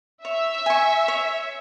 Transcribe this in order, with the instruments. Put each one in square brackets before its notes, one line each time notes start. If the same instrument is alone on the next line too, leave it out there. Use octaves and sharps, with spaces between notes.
[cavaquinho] C#5 [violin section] E5
[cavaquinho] G#5 C#6
C#5